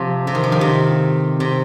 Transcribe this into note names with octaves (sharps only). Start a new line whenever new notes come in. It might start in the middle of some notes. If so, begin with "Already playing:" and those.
Already playing: C3 F3
C3
D#3
F3
D#3
C3
C3